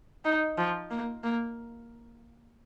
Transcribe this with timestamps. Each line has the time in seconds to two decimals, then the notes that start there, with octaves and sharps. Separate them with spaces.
0.25 D#4
0.58 F3
0.91 A#3
1.24 A#3